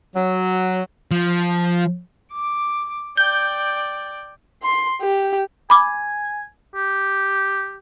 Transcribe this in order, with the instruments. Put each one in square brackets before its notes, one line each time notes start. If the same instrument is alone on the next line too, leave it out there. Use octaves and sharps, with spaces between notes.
[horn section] F#3
[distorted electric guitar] F3
[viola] D6
[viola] D5 G5 [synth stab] G6
[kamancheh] C6
G4
[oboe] G#5 [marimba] B5 D6
[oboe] G4